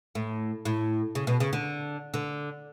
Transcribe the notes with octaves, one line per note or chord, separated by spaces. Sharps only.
A2
A2
C#3
B2
C#3
D3
D3